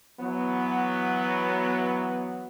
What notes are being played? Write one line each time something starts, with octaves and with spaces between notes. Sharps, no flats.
E3 F#3 B3